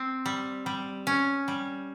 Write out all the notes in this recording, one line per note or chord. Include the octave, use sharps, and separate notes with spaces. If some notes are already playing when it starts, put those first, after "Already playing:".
Already playing: C4
G3
G3
C#4
G3